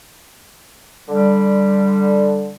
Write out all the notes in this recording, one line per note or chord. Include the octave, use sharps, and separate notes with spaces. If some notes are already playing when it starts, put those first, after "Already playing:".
D3 G3